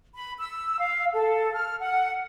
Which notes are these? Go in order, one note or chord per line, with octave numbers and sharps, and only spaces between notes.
B5
E6
F5
A4
F6
F#5